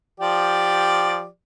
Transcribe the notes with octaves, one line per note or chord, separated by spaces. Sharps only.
F3 G4 D5